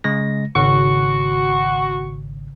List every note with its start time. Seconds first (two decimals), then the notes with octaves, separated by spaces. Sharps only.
0.04 C#3 G#3 A#6
0.55 G#1 C#3 F#4 C#6